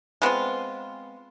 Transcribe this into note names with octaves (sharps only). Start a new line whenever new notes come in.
G#3 B3 C4 F4